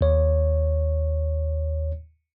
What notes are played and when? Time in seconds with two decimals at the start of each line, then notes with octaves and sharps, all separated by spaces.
0.01 D#2 C#5